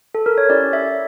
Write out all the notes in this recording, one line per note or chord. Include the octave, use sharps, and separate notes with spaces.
A4
A#4
C#5
C#4 E4 G4 D5
E5